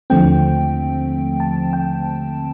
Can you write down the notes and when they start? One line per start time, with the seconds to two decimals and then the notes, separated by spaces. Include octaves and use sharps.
0.10 D#2 D3 F3 A3 C4 G5
1.40 A5
1.73 G5